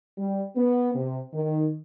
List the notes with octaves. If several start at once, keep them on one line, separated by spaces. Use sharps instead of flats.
G3
B3
C3
D#3